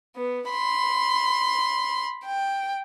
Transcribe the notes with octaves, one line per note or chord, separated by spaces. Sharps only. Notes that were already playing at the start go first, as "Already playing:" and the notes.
B3
B5 C6
G5